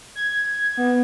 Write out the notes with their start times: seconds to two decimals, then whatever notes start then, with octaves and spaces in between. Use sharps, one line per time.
0.15 G#6
0.77 B3